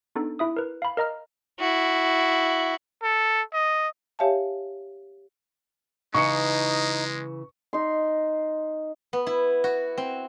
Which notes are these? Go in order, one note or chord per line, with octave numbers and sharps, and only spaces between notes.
B3 D4 D#4 A4
E4 E5 D#6
A#4 B4
F5 B5
A#4 D#5 A#5 F6
E4 F#4
A4
D#5
G4 C#5 E5 F5 G#5 A5
C#3 E3 G#3 D#4 C#6 C#7
D#4 C6
B3
E4
F#4
C4